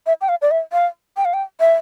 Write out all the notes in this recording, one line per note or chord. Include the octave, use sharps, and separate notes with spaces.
E5
G5
F5
D5
E5
F5
G5
F5
G5
E5